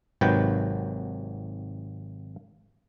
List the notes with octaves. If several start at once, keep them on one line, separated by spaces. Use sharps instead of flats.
G#1 C3 D#3 F#3 B4 G5